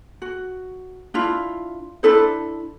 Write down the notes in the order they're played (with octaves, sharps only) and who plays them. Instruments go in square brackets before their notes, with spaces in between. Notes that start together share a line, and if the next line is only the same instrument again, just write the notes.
[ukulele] F#4
D4 E4 F4
D4 E4 A4 C5